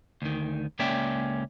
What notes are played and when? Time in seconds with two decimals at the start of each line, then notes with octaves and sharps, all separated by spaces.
0.22 D2 D#3
0.79 C#2 A#3 C#4 D5 E5 G5